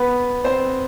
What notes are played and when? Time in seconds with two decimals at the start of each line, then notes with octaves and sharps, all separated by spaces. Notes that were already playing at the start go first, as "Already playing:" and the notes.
Already playing: B3 B4
0.44 C4 C5